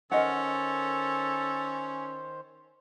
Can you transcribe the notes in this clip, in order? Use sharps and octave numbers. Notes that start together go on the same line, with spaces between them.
D#3 C#4 A4 A#4 C5 D#5 F#5